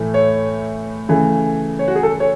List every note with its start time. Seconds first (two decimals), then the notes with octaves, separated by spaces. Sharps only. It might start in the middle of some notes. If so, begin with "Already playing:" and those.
Already playing: A2 E3 A3
0.14 C#5
1.09 C#3 E3 A3
1.79 C#5
1.88 F#4
1.96 G#4
2.03 A4
2.20 C#5